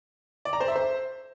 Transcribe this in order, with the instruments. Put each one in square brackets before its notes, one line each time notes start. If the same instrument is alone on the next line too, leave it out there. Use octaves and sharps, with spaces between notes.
[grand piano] D5
A#5
C5
E5
C5